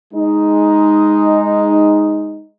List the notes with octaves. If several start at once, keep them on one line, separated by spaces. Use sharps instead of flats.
G#3 D#4